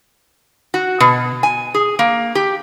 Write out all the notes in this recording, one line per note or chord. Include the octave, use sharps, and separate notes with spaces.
F#4
B2
G#5
G#4
A#3
G4